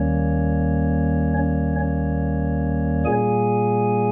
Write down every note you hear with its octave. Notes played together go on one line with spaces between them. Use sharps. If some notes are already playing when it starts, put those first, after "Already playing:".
Already playing: D#2 D#3 G3 A#3 C#4 C#5
C#4 C#5
C#4 C#5
A#2 G3 A#3 G#4 G#5